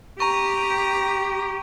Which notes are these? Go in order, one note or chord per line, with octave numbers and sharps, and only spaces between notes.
G4 A#5 C#6